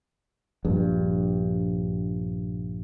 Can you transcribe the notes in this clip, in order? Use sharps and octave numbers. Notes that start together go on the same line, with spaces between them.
A#1 G2